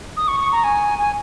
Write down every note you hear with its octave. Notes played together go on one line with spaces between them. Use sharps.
D#6
C#6
C#6
A#5
G#5
G#5